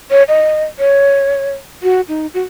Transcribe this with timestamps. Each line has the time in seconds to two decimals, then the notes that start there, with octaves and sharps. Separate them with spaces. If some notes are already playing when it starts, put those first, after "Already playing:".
0.11 C#5
0.28 D#5
0.79 C#5
1.83 F#4
2.09 D#4
2.34 F#4